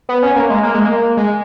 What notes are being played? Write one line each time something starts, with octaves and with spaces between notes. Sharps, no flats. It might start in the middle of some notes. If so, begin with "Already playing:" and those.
B3
C#4
A#3
G#3
A#3
G#3
A#3
G#3